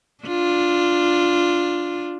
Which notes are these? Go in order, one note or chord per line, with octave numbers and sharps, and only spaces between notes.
D4 F4